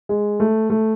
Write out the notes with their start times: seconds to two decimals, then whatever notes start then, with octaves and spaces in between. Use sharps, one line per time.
0.09 G#3
0.40 A3
0.70 A3